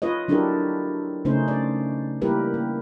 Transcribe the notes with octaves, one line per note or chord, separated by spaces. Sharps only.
F4 B4 C#5 D#5
F#3 D4 E4 G4 A4 A#4
C#3 A3 C#4 D#4 C5
D5
G3 A#3 E4 G4 A#4 B4
A#3